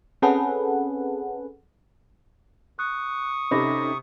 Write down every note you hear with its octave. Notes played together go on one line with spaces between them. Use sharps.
C4 C#4 G#4 A4 B4 F#5
C#6 D#6 F#6
C3 C#4 D#4 A4 B5 D6 A#6